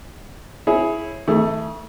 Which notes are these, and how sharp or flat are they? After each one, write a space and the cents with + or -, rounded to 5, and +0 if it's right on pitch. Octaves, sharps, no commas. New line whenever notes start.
E4 +0 G#4 +15 C#5 -20
E3 -45 A3 +10 G#4 +0